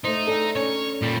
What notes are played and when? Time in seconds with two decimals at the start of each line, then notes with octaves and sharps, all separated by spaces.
0.04 A3 D#4 C5
0.27 D4 G#4 A4 E5
0.55 C#4 D4 C#5
1.03 A#2 G3